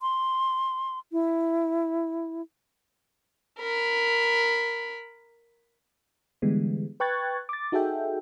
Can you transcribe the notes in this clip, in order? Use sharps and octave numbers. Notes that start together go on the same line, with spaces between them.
C6
E4
A#4 B5
D3 E3 G3 G#3 B3
B4 G5 C#6 F#6 G#6 A6
D6 A6
D#4 F#4 G#4 A4 E5 G5